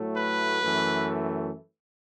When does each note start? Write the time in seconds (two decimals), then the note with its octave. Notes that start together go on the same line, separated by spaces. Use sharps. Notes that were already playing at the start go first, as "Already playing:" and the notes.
Already playing: A2 F#3 A3
0.17 B4
0.63 F#2 E3 A3